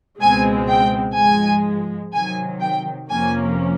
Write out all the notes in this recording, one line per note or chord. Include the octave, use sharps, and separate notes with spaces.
C#2 B2 G#3 C4 G#5
G5
G#2 F3 G#3 G#5
C3 D#3 F#3 G#5
G5
F2 C3 F3 A#3 C#4 G#5